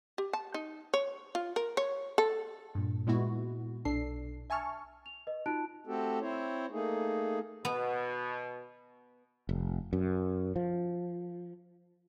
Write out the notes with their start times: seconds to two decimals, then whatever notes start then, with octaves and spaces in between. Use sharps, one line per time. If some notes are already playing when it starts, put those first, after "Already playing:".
0.18 G4
0.33 A5
0.54 D#4
0.94 C#5
1.35 F4
1.56 A#4
1.77 C#5
2.18 A4
2.75 G2 A#2
3.07 A#2 G#3 B3 E4 F#4
3.85 B1 D4 A4 C7
4.50 E5 G#5 A5 C#6 F6
5.06 F7
5.27 B4 D#5
5.46 D#4 F4 F#4 A5 F#6 D7
5.87 A3 C4 F#4 G4 A4
6.20 C4 E4 C5 C#5
6.71 A3 A#3 D#4 G#4
7.65 B2 B3
9.49 F1
9.93 F#2
10.56 F3